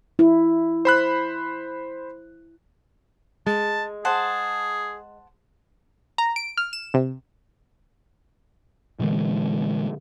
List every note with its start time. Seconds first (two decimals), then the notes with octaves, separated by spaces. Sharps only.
0.19 E4
0.85 C5 B5 F#6
3.47 G#3 A5
4.05 G#4 C5 F#5 A5
6.18 A#5
6.36 D7
6.57 F6
6.73 E7
6.94 C3
8.99 A#2 D3 E3 G#3